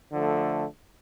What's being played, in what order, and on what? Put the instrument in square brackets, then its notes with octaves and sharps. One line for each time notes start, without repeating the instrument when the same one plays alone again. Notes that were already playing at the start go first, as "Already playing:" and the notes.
[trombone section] D3 F3 A3